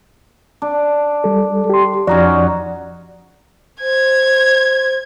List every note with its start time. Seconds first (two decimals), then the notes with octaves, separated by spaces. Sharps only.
0.62 D4
1.24 G3 A4
1.70 G4 C6
2.07 F2 F3 C#4 D#4 F#4 D5
3.81 C5 G#6